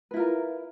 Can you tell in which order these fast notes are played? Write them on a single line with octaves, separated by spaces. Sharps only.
B4 E4 F4 A#4